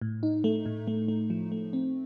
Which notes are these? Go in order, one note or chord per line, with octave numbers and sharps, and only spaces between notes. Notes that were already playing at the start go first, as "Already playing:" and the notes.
A2
D#4
A3
A2
A3
A3
F3
A3
C4